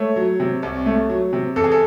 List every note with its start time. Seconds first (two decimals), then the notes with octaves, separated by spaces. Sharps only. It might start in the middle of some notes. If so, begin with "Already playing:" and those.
Already playing: A3 C#5
0.16 F#3
0.40 C3
0.63 C2
0.86 A3
1.09 F#3
1.33 C3
1.56 E2 A4
1.64 G#4
1.72 A4